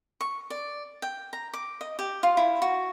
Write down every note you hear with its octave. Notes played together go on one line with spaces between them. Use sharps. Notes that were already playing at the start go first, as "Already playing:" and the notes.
C#6
D5
G5
A#5
D6
D#5
G4
F4
E4
F#4